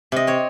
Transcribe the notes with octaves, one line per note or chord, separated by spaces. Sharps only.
C3 D#5
C4 C#5